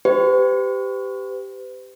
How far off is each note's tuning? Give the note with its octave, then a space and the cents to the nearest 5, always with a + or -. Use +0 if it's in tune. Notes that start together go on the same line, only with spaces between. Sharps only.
G4 +0 B4 +45